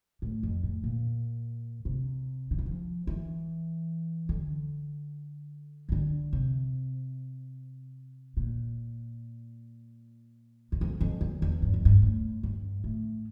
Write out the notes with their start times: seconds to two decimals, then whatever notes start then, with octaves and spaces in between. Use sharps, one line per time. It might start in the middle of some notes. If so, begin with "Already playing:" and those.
0.22 A2
0.43 F2
0.63 A2
0.84 A#2
1.85 C3
2.51 D3
2.59 E3
2.66 F3
3.07 E3
4.29 D3
5.89 E3
5.92 D3
6.33 C3
8.37 A#2
10.72 E2
10.81 F2
11.01 F2
11.21 E2
11.42 E2
11.62 G2
11.74 F2
11.85 G2
12.02 A2
12.43 G2
12.84 A2